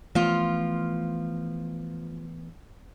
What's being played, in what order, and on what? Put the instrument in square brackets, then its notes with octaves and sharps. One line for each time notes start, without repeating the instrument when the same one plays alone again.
[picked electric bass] E3 A3 B3 [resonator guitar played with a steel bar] F3 F4